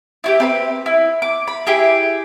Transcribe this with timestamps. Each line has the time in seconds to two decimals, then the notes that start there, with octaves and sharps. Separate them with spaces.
0.24 E4 F#4 G4
0.40 C4 B4 B5
0.86 E4
1.22 D6
1.48 B5
1.67 E4 G4 G#4